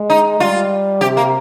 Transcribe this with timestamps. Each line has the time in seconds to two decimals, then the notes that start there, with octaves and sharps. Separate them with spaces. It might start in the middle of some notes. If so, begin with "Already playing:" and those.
Already playing: G#3
0.10 D#4
0.40 G3 F4
1.01 C3 G4
1.17 A#3